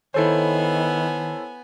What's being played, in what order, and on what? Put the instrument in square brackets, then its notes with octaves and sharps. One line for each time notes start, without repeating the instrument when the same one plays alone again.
[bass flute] D#3 [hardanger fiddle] B3 G#5 [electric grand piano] E4 A4 C5 [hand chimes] C#5